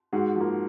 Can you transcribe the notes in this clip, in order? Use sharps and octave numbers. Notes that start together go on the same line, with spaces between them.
G#2 F#4 G#4
F3 A#3